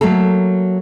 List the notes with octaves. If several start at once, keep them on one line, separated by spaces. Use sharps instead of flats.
F#3 A3 A#3 A4